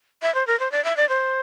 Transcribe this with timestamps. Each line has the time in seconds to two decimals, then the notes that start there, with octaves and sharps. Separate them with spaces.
0.22 E5
0.35 C5
0.47 A#4
0.60 C5
0.72 D5
0.84 E5
0.97 D5
1.09 C5